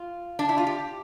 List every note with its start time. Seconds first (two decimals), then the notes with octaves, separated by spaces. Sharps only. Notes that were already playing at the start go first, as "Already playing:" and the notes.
Already playing: F4
0.39 D4
0.49 E4
0.57 F4
0.66 G4